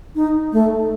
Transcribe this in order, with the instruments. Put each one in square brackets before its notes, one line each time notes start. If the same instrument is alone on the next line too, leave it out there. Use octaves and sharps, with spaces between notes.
[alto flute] D#4
A3